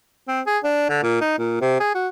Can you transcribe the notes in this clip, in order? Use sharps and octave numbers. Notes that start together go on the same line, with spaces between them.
C4
G#4
D4
D3
A#2
D#4
A#2
C3
G#4
F#4